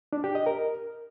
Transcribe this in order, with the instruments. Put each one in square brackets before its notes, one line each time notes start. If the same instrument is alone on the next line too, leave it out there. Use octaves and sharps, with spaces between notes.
[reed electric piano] D4
G4
D#5
A#4